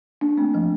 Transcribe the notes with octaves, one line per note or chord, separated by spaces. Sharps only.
A#3 D4
A3 C4
F3 A3